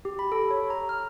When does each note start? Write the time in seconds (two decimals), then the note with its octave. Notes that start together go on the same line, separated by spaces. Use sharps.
0.05 G4
0.19 B5
0.32 A4
0.51 C#5
0.70 A#5
0.89 F6